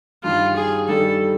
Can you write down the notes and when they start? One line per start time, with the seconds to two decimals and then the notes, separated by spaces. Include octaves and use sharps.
0.24 G2 D#3 G3 F4
0.56 G#4
0.88 G2 D#3 G3 A4